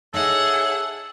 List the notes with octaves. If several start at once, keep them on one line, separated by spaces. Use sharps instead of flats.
D#4 G#4 A4 C#5 E5 F#5